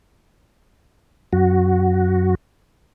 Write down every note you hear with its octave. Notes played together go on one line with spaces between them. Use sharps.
F#2 F#4